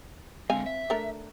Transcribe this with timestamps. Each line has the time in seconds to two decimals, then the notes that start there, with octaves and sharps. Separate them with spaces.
0.50 D3 G#3 C4 F5 G#5
0.66 E5
0.90 A3 D4 A#4